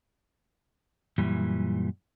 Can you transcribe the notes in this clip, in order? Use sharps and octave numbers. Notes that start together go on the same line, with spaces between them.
F#2 A#2 E3 G3